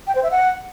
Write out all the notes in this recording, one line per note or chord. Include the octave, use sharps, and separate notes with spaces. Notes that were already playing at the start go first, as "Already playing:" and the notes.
G5
C5
E5
F#5